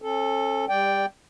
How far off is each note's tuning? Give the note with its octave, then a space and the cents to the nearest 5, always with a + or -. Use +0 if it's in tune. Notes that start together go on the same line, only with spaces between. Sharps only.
C#4 -40 A4 +0
G3 +20 D5 +0 G5 +0